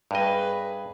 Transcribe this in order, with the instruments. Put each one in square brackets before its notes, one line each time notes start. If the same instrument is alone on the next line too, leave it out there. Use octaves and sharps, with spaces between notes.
[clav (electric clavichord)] G2 D#5 [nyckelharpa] G#4 B4